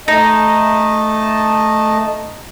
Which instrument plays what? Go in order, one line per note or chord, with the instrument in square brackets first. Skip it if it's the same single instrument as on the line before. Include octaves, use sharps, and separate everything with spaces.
[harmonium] A3 D#5 A5 [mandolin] D#4